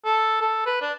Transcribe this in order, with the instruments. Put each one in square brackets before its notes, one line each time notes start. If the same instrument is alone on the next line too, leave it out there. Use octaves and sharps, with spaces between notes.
[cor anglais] A4
A4
B4
D4